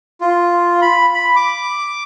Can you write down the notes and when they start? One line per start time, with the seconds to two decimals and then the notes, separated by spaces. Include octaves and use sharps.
0.21 F4
0.82 B5
1.14 B5
1.36 D6